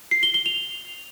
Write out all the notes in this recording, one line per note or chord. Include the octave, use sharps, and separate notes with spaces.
C7
G7
G7
F7